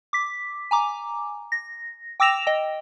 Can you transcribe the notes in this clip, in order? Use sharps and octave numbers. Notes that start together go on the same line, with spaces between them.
D6 B6
G#5 A#5 D6
A#6
G5 D6 E6 A#6 E7 F7
D#5 G5